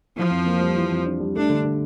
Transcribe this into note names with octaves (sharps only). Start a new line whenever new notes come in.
E3 F3
F2
A#3
G3
E3
F2
D4
G3
A3 D4
D3
D3